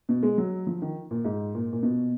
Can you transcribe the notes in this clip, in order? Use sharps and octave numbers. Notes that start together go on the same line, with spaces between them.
B2
G#3
F#3
F3
D#3
A#2
G#2
A#2
A#2
B2